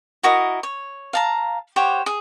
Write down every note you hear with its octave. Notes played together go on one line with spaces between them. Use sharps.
E4 F#4 A#4 D#5
C#5
F5 A5 A#5
G4 C5 C#5 F#5
G#4